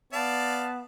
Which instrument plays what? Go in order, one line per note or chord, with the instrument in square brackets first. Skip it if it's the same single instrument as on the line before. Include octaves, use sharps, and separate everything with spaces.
[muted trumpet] B3 [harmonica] D5 F5 [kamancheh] A5